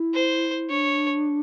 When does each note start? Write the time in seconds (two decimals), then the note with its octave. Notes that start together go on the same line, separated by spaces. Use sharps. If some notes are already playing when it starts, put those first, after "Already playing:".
Already playing: E4
0.14 C5
0.70 D4 C#5